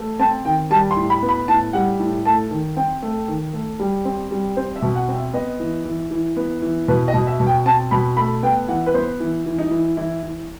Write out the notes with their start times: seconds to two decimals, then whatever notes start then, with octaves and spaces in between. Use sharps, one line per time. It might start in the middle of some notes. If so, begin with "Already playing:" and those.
Already playing: A3
0.19 C4 A5
0.45 D#3 G5
0.70 G3 A5
0.91 C6
0.96 A2
1.10 B5
1.23 B3
1.29 B5
1.48 A2 A5
1.73 G3 F#5
1.99 A2
2.25 A3 A5
2.51 D#3
2.76 C4 G5
3.02 A3
3.28 D#3
3.53 A3
3.79 G3
4.05 C4
4.31 G3
4.57 C4 C5
4.76 E5
4.82 B2
4.95 F#5
5.08 C4
5.14 E5
5.33 B3 D#5
5.60 E3
5.85 E3
6.11 E3
6.37 B3
6.62 E3
6.88 B2 B4
7.08 D#5
7.14 B2
7.27 E5
7.40 B2
7.47 G5
7.66 C4 A5
7.91 B2 B5
8.17 A3 B5
8.43 B3 G5
8.68 E3 F#5
8.86 B4
8.94 B3 C5
9.20 E3
9.46 E3
9.58 D#4
9.71 E3
9.97 E3 E4
10.23 E3